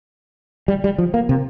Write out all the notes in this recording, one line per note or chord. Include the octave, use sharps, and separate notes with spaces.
G3
G3
F3
A#3
C3